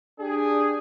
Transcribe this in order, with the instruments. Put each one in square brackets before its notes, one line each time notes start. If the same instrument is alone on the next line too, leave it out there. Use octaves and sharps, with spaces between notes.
[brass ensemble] D4 G4 G#4